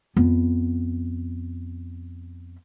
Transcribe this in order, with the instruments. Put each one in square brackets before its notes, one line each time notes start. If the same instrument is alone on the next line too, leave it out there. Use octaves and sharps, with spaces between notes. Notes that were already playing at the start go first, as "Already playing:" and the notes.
[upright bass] F2 B3